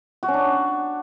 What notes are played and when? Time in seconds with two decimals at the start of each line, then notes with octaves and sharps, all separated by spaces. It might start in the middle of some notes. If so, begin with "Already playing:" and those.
0.23 F#4
0.28 C#4
0.34 D4